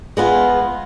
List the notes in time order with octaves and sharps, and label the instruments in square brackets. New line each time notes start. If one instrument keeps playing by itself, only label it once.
[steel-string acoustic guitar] G#3 B3 F4